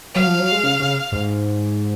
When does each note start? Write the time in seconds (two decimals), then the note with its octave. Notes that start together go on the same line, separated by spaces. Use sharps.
0.15 F#3 F5
0.27 F3
0.39 F#3
0.52 G#3
0.64 C#3
0.80 C#3
1.12 G#2